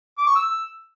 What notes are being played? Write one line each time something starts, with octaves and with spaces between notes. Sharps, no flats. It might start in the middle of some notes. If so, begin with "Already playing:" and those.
D6
C#6
E6